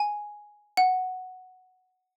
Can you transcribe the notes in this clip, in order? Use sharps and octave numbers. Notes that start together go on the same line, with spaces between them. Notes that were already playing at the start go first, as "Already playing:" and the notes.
Already playing: G#5
F#5